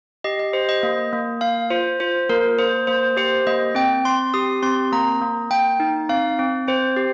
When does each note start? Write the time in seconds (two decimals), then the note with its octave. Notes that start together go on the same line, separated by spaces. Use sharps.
0.24 G4 D#5
0.39 D#5
0.53 G4 C5
0.69 D#5
0.83 A#3
1.13 A#3
1.41 A#3 F5
1.70 F4 C5
2.00 F4 C5
2.29 A#3 A#4
2.58 A#3 C5
2.87 A#3 C5
3.17 G4 C5
3.47 A#3 D#5
3.75 C4 G5
4.05 C4 C6
4.34 G4 D#6
4.63 C4 C6
4.92 A#3 A#5
5.21 A#3
5.51 A#3 G5
5.80 D#4
6.09 C4 F5
6.39 C4
6.68 C4 C5
6.97 G4